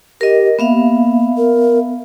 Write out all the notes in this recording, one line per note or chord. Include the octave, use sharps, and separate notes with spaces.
G4 A#4 D#5
A#3 B3 E5 F5
A#4